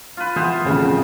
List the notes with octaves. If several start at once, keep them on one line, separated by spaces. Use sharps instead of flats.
F4 B4
E3 B3 C5
E1 F2 A2 C#3 C#4